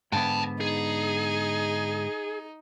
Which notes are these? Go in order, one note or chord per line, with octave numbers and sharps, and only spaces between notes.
G#2 D3 B3 G5 A5
D#4 G#4